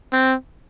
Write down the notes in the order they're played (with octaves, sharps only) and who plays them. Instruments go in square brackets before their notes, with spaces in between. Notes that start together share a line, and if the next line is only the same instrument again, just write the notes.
[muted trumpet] C4